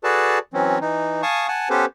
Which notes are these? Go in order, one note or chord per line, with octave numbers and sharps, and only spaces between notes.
F#4 G#4 A4 B4 D5 A5
E3 F#3 C4 C#4
E3 D#4
F5 G#5 A5 C#6 D#6
F#5 G#5 A5
B3 C#4 G4 A4 B4 C5